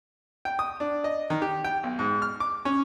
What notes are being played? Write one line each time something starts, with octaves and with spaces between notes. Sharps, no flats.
G5
D#6
D4
D#5
D#3
G4
G5
B1
G#2
F6
D6
C#4